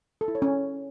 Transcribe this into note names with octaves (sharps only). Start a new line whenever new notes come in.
A4
E4
C#5
C#4